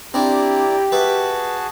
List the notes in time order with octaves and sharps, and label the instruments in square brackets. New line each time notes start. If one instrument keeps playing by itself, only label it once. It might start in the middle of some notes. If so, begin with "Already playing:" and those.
[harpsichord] C4 D4 [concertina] E4 D5 A#5 [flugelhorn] G4
[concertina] F#4 G#4 A5 [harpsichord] B4 E5